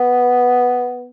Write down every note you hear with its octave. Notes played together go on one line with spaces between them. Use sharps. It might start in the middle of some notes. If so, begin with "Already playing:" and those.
Already playing: B3